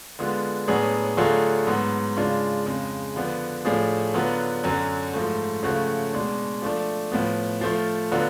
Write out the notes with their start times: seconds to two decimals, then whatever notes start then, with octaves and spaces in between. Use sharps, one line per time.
0.19 D3 G#3 B3 F4
0.68 A2 F#3 B3 D4 G#4
1.17 D3 F#3 A3 F4 G#4
1.67 G#2 F#3 B3
2.17 C#3 G#3 D4 F4
2.66 F2 C#3 G#3
3.16 D3 F3 B3
3.65 A2 F3 A3 D4 G#4
4.14 D3 F#3 B3 F4
4.64 F#2 D3 F#3
5.14 G#2 F3 A3
5.63 C#3 F3 A3 C#4 F#4
6.13 B2 G#3 D4
6.62 F3 A3 D4
7.12 A2 F3 B3
7.61 F3 A3 F4
8.12 D3 F#3 B3 F4